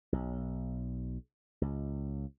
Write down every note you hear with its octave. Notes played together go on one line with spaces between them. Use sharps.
B1
C#2